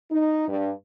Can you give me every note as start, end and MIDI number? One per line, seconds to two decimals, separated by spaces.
0.11 0.46 63
0.49 0.71 43